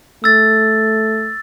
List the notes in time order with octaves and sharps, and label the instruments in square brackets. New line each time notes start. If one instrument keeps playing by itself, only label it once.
[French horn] A3 [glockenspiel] E6 A6